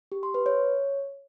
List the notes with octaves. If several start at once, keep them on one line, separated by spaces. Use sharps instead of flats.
G4
C6
B4
C#5